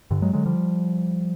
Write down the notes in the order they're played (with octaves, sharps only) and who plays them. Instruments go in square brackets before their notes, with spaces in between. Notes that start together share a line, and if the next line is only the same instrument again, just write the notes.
[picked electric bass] G2 D3
F#3 G#3
D3 F#3 G#3
F3 G3